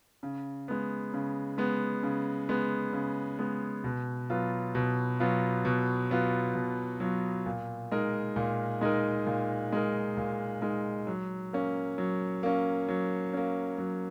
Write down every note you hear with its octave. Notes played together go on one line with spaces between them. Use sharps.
C#3
G#3 B3
C#3
G#3 B3
C#3
G#3 B3
C#3
G#3 B3
B2
F#3 B3 F4
B2
F#3 B3 F4
B2
F#3 B3 F4
B2
F#3 B3 F4
A#2
G#3 D#4 A#4
A#2
G#3 D#4 A#4
A#2
G#3 D#4 A#4
A#2
G#3 D#4 A#4
F#3
A#3 C#4
F#3
A#3 C#4
F#3
A#3 C#4
F#3